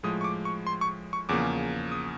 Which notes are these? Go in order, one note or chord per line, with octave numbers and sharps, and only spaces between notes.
A2 F3 G#3 D#6
C#6
D6
C#6
C6
C#6
C#6
E2 C#3 F3 A#3 D6
D#6